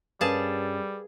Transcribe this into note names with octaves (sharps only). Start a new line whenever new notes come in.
G2 G3 C#4 G#4 A#4 B4 F5 A5